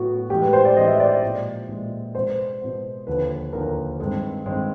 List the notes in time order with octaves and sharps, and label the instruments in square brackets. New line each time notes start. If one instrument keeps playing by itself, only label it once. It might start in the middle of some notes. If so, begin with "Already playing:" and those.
Already playing: [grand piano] A2 F#3 B3 [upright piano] F#4
[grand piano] A2 E3 G#3 [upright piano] G4
[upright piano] B4
C5
D5
[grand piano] A2 E3 G#3 [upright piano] D#5
[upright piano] E5
D5
[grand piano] A#2 F3 G#3
A#2 F3 G#3
[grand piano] B2 G#3 B3 [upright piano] C5
[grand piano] B2 G#3 B3
[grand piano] D#2 D3 F3 [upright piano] B4
[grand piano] D#2 D3 F3 [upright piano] A#4
[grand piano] G2 D#3 G#3 C4 [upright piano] A4
[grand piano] G2 D#3 G#3 C4